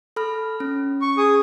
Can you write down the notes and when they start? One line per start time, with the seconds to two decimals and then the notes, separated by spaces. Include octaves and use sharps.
0.16 A4 B5 F6
0.60 C#4
1.02 C#6
1.18 G#4 D#6